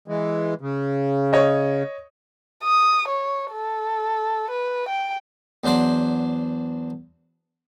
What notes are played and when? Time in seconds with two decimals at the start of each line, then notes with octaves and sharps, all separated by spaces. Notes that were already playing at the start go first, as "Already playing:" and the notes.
0.08 E3 G#3
0.61 C#3
1.33 C#5 D#5
2.64 D#6
3.08 C#5
3.52 A4
4.51 B4
4.89 G5
5.64 E2 F#3 D4 C5 D5